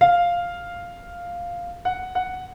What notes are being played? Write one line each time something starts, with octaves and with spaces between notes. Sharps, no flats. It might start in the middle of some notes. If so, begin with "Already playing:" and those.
F5
F#5
F#5